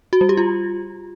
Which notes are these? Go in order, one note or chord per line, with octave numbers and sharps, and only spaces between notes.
F#4
G3
G4
F4